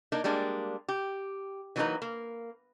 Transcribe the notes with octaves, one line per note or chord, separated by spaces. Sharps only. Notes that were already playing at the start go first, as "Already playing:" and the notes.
A#3 D4 D#4
G3 G#3 A#3 D4
G4
E3 F#3 A#3 C4 D#4 B4
A#3